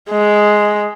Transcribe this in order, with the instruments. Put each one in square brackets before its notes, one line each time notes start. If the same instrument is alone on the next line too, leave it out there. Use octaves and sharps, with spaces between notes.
[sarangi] G#3